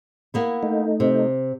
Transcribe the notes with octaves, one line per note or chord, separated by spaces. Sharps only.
A#3 B3 E4
A3 D#4
C3